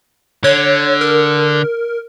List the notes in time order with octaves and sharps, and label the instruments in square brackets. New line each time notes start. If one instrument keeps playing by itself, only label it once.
[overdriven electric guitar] D3 [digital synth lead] C#5
[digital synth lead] A#4